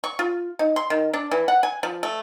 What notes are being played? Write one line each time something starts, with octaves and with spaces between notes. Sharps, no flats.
C#6
F4
D#4
C6
D#3
D4
E3
F#5
G#5
F3
A3